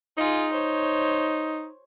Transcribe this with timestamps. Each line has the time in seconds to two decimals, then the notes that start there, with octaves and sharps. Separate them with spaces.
0.18 D#4 F4 G#4
0.53 C5 C#5